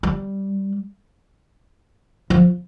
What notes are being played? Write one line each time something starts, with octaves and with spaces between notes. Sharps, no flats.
G3
F3